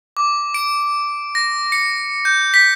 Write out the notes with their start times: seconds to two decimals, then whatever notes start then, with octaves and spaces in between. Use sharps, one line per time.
0.17 D6
0.54 D7
1.35 A#6
1.72 C#7
2.25 G6
2.54 B6